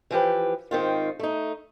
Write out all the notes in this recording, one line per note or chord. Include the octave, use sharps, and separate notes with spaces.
E3 F3 G4 B4
G#2 D#3 C4 F4
A3 D#4